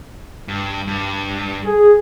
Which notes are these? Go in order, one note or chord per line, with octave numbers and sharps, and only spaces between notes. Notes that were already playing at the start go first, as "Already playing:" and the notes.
G2
G2
G#4